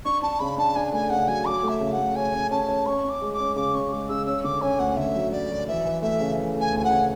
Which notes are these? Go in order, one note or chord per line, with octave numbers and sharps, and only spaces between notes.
D4 C#6
D4 A5
C#3 B5
D4 A5
D4 G#5
A3 G#5
C#3 F#5
F#3 G#5
F#3 D6
A3
E5
C#3
F#5
A3
C#4 G#5
C#4
C#4 A5
C#4
C#4 C#6
C#4
D6
G#3
D6
C#4
C#3 D6
C#4 C#6
G#3 D6
C#3 E6
C#4 E6
D3 D6
C#4 G#5
D2 F#5
D3 E5
F#3
F#3 D5
F#3
E3 E5
E3
A3 E5
C#3
E3
A3
G#5
D2
G#5
F#5
C#3